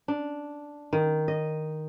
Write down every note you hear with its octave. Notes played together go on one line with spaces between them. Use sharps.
D4
D#3
D#5